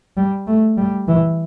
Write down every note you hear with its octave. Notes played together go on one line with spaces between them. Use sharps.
G3
A3
G3
E3